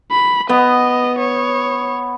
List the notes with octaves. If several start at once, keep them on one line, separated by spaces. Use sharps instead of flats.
B5
B3 D#5
C#5